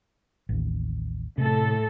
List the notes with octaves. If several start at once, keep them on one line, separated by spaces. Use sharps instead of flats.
A1 D#2
A2 C3 A4